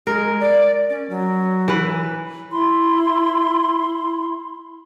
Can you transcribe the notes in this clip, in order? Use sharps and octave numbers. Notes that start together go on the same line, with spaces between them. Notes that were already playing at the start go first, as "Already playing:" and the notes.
G#3 A#4
D5
C#4
F#3
E3 B4
E4 B5 C6